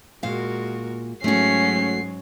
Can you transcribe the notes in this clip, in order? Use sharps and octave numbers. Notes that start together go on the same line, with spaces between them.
A#2 G#3 F#4 A#4 F5
G#2 F#3 G#3 A3 C#4 F#4 C7